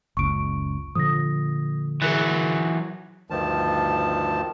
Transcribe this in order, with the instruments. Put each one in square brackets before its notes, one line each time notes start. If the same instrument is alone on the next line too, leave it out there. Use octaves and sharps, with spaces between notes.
[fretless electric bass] F#1 C#2 [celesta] C#6 D7
[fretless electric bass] A#2 D3 F3 [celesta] D#6 A#6
[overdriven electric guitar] E3 F#3 [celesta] G#4 A#4 F#6
[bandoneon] D2 G2 D#3 F3 A5